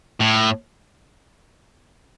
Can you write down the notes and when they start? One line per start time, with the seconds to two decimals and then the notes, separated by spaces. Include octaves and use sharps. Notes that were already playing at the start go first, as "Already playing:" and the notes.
0.20 A2